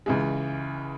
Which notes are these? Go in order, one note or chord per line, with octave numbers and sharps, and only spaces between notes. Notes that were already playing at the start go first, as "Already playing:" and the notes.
C#2 C#3 E3 G#3